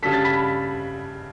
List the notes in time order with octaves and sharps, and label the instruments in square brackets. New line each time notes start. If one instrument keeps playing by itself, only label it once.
[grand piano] C#3 G3 D4 A4 [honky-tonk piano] B6
[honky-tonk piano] A6
B5 B6